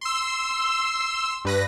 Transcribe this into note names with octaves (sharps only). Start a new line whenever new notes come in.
C6 E6
G2 B4 A#6